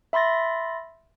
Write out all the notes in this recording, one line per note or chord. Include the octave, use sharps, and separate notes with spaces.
E5 B5 C6 A6 A#6